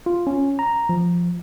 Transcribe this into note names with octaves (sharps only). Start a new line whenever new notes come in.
F4
C#4
A#5
F3